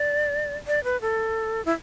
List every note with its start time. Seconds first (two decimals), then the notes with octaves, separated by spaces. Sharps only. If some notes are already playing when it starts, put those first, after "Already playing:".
Already playing: D5
0.67 D5
0.84 B4
1.01 A4
1.65 E4